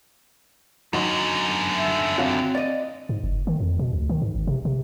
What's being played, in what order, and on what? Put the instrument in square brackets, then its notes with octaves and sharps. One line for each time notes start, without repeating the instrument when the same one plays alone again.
[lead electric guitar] F#2 D3 [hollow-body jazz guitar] F#3 D#4 F#4
[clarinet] E5
[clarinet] C4 [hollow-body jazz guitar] F#4 C#5 F5
[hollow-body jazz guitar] D5 D#5
[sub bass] G#2
F#1
D#3
F2
B2
D2
D#3
G#2
G#1
C3
C3